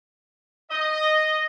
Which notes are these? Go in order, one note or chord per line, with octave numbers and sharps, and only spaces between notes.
D#5